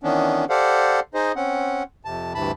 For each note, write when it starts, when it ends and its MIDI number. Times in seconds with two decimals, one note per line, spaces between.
0.04 0.45 51
0.04 0.45 52
0.04 0.45 59
0.04 0.45 61
0.04 0.45 62
0.50 1.00 67
0.50 1.00 69
0.50 1.00 72
0.50 1.00 74
0.50 1.00 77
0.50 1.00 78
1.14 1.32 63
1.14 1.32 68
1.14 1.32 72
1.14 1.32 75
1.36 1.83 60
1.36 1.83 61
1.36 1.83 78
2.05 2.34 41
2.05 2.34 48
2.05 2.34 81
2.34 2.52 38
2.34 2.52 43
2.34 2.52 48
2.34 2.52 52
2.34 2.52 81
2.34 2.52 83